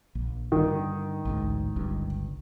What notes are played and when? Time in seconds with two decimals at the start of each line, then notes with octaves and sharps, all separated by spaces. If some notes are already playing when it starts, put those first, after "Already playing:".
0.15 A#1
0.52 G2 D3 D#3
1.25 A1 D2 G#2
1.76 G1 C#2 G2